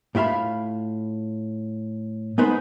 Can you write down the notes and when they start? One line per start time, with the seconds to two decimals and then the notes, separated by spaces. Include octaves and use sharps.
0.15 A2 F4 E5 F5 B5
2.38 G#3 B3 D#4 B4 C5